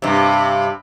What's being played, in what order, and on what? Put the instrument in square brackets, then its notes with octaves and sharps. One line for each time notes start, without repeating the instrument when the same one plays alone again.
[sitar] G2 C3